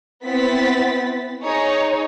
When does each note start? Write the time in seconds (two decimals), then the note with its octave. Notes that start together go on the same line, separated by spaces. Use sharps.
0.23 B3 C4 E4 A6 B6
1.44 D#4 G#4 C#5